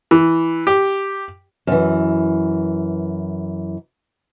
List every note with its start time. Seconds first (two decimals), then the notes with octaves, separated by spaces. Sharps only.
0.11 E3
0.67 G4
1.67 F#2 E3